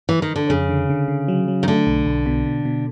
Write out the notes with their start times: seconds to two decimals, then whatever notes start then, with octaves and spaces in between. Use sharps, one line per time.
0.09 E3
0.22 D#3
0.36 D3
0.49 F2 C#3
0.69 D3
0.90 D3
1.08 D3
1.28 F#3
1.48 F#3
1.63 D#3
1.67 D3 A3
1.87 B1
2.06 B1
2.26 B2
2.46 B2
2.65 B2